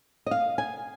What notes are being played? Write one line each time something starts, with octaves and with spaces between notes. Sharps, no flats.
D#5
F5
G#5